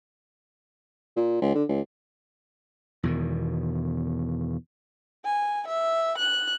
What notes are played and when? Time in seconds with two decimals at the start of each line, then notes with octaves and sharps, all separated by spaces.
1.17 A#2
1.42 C#2
1.55 D3
1.69 C#2
3.03 E2 B2 D#3
5.25 G#5
5.68 E5
6.19 F#6